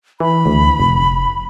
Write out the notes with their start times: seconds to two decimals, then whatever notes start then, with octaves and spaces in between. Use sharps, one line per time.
0.20 E3 B5
0.46 D2
0.80 F1